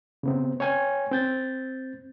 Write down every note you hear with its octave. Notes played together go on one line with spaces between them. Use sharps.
C#3 B3 C4
C#5 G5 G#5
C4 G6 A6